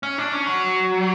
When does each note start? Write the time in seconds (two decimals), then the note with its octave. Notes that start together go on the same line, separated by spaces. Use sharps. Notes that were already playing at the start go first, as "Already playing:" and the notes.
0.03 C#4
0.18 D4
0.33 C#4
0.47 F#3